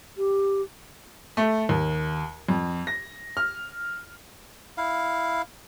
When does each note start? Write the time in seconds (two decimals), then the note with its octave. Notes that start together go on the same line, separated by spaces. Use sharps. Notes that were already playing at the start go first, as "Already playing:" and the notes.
0.17 G4
1.37 A3
1.69 D#2
2.49 F2
2.87 A#6
3.37 F6
4.78 E4 F5